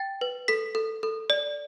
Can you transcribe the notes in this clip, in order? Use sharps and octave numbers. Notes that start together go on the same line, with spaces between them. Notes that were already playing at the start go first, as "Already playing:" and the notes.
Already playing: G5 A6
B4
A4 B6
A4
A4
D5